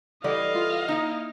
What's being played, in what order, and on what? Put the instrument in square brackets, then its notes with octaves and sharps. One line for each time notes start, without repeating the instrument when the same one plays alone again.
[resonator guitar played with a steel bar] E3 G3 E4 [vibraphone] A4 F#5 [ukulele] D5 [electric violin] D#5 F5
[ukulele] F4
[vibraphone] A#3 [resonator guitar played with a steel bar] D#4 E4